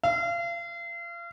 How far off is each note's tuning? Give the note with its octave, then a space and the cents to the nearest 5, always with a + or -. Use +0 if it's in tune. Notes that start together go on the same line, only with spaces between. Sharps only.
F5 -35